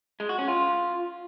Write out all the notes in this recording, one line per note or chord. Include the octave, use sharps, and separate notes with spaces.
G#3
F#4
C#4
F4